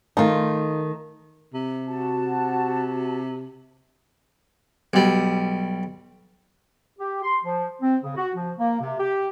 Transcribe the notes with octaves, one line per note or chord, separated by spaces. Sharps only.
D#3 A3 D#4 F4
C3
F#4 A5
B1 G3
G4
C6
F3
C4
C#3
F#4
F3
A#3
C3
G4